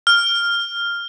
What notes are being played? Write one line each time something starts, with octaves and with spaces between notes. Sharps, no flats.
F6